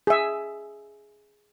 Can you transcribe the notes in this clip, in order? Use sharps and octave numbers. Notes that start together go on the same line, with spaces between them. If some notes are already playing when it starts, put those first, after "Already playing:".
G#4 E5